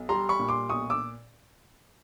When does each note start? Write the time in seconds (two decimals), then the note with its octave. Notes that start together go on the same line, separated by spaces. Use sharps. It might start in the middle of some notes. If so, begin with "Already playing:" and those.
Already playing: B1
0.09 G3 A#5 C6
0.29 B5 C#6
0.40 A#2
0.49 C6 D6
0.69 B1 C#6 D#6
0.90 D6 E6